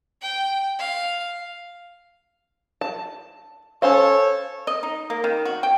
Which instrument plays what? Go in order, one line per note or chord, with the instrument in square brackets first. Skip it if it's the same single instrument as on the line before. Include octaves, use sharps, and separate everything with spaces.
[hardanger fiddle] G5
F5
[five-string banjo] A5
[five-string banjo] C#4 C5 F5 [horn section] A4 C#5
[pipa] D#5
D#4
A#3
D#3
F#4
G5